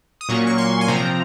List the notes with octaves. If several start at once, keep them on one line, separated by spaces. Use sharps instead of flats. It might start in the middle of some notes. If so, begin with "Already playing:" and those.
D#6
A#2 F#3 A#3 C#4 C#6
C#6
C6
G#5
C3 F3 C4 A#5